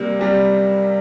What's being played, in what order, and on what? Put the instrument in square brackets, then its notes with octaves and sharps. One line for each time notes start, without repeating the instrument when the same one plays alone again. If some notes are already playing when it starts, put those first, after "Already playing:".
Already playing: [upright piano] C3 G3 A#3
C3 G3